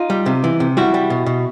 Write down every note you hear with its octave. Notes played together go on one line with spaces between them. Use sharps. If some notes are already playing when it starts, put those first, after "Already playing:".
Already playing: D#4 F4
G3
C3
E3
C3
G3 E4 F#4
G3
B2
B2